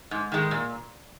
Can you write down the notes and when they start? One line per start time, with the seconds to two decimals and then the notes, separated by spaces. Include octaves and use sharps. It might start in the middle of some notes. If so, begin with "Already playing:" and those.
0.11 G#2
0.32 D#3 G#3
0.51 A#2